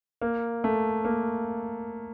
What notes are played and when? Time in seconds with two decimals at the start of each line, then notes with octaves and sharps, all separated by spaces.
0.22 A#3
0.64 A3
1.05 A#3